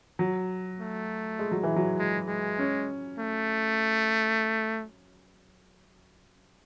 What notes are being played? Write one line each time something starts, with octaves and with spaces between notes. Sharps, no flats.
F#3
A3
G#3
F#3
E3
F#3
G#3
G#3
C#4
A3